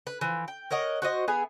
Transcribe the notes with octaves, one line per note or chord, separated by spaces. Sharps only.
B4
E3 F3
G5
A#4 C#5 D#5 F#5
F#4 C5 D#5
B3 G#4 E5 G#5